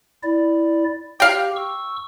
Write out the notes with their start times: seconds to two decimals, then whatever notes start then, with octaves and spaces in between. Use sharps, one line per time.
0.23 E4 D5
1.20 G4 F5 G5
1.56 C#6 E6